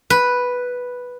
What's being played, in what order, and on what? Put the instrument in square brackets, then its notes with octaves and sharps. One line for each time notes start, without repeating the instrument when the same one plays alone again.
[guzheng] B4